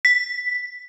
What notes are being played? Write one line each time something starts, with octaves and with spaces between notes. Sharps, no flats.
B6